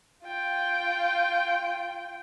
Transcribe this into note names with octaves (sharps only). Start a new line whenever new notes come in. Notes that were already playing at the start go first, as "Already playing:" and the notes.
F4 G5